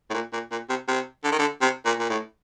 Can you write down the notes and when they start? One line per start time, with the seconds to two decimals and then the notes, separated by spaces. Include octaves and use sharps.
0.10 A2
0.14 A#2
0.33 A#2
0.52 A#2
0.70 C3
0.88 C3
1.24 D3
1.32 D#3
1.39 D3
1.61 C3
1.86 A#2
1.99 A#2
2.10 A2